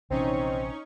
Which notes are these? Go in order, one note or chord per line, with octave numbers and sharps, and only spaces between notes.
A#1 C3 E3 C4 C#4 D#4 C#6